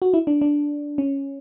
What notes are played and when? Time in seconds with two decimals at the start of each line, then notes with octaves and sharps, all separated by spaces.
0.02 F#4
0.14 E4
0.27 D4
0.41 D4
0.98 C#4